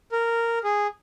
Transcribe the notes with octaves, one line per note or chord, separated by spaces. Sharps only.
A#4
G#4